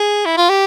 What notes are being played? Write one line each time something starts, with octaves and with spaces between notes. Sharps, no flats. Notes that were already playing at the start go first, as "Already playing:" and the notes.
Already playing: G#4
E4
F4
G4